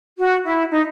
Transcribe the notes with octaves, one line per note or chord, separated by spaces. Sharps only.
F#4
E4
D#4